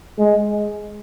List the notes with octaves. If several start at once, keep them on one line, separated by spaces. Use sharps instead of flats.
G#3